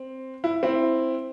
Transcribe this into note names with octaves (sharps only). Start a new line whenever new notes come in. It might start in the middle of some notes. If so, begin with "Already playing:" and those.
Already playing: C4
E4
C4 E4